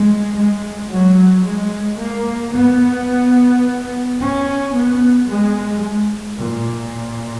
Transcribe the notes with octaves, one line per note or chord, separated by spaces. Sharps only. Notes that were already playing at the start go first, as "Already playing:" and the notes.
Already playing: G#3
G#3
F#3
G#3
A#3
B3
C#4
B3
G#3
A#2